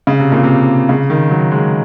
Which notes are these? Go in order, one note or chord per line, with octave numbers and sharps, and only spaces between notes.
C#3
C3
A#2
C3
C#3
D#3
F#3
G#3